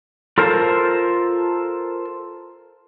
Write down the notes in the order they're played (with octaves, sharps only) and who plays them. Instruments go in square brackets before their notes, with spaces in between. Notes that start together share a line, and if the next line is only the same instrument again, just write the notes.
[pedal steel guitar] F4 A4 A#4 C5 A5